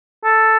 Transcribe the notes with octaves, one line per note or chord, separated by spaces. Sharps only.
A4